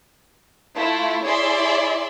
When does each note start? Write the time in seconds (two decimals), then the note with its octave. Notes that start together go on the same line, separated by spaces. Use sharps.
0.76 A3 E4 F4
1.25 E4 G#4 C#5 D5 E5 C6